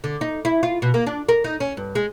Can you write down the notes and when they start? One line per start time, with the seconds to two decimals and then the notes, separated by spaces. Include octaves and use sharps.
0.04 D3
0.21 D#4
0.45 E4
0.63 F4
0.82 B2
0.94 A#3
1.07 D4
1.29 A#4
1.44 D#4
1.60 C#4
1.77 G2
1.95 G#3